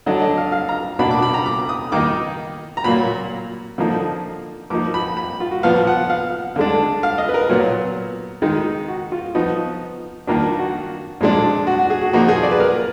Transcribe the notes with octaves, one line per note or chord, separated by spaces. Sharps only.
D3 F#3 D4 D#5
D#5
F5
F5
A#5
B2 A#3 D4 B5
D6
B5
A#5
D6
D#6
D#3 A#3 D#4 D6
A#5
A#2 F#3 A#3 B5
D3 F3 A#3 D#4
F3 A#3 D#4 D6
B5
B5
F4
F#4
A#2 F3 B3 F5
F#5
F5
D3 G#3 D4
F5
D#5
B4
A#4
A#2 F#3 B3
D#3 G#3 D#4
F#4
F4
F3 B3 D#4 F#4
D#3 A#3 D4 F4
F#4
A#2 F3 G#3 D4
F#4
F#4
G#4
F#4
A#2 F3 A#3 D#4 F#4
G#4
D5
B4
A#4